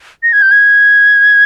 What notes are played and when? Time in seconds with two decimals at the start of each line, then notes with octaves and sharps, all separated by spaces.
0.23 A#6
0.33 G#6
0.42 G6
0.51 G#6